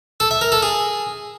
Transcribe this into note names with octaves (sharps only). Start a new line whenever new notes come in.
A4
E5
A#4
A4
G#4